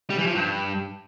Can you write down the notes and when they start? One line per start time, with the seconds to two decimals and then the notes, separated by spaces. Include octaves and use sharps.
0.10 G3
0.18 E3
0.27 F3
0.35 G2